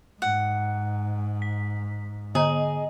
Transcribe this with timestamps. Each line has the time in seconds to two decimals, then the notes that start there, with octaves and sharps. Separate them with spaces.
0.22 G#2 F#5
1.42 B6
2.35 D3 G#4 D#5 A#5